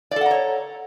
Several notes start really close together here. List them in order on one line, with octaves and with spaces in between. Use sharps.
D5 A4 F#5 A#5 C#5